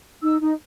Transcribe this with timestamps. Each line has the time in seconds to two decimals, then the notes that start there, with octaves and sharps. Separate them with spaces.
0.22 D#4 E6
0.40 D#4